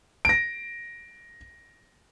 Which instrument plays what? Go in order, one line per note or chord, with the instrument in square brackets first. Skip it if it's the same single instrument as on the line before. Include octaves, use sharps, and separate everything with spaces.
[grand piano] A#6 D7